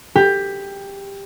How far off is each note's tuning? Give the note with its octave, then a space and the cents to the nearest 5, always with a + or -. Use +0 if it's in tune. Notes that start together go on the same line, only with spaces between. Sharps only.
G4 +15